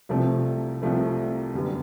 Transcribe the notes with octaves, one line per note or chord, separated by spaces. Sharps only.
C2 C3 F3 A3 C4
C2 C3 F3 A3 C4
F#2 D3 G3 B3